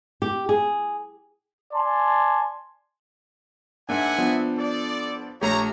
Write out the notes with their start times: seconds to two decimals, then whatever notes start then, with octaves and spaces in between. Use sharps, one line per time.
0.22 G4
0.49 G#4
1.74 D5 G#5 A5 C6
3.89 G#2 A#3 D4 E5 F#5 G#5
4.18 F3 B3 D4
4.58 A4 D5
5.42 A#1 A3 G4 C#5 A#5